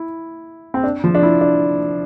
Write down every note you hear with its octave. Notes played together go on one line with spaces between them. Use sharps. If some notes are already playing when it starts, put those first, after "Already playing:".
Already playing: E4
C4
D4
F3
D4
E4
D4